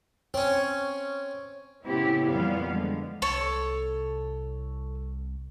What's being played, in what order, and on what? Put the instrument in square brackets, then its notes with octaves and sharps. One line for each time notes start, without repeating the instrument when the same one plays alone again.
[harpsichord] C4 C#4 [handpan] C#5
[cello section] A2 C#3 B3 C4 E4 G4
F2 A#2 E3 G3 B3 F5
D3 G#3
[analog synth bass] C2 [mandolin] A4 C#5